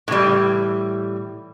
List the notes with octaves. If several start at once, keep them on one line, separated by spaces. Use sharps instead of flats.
A2 E3 G3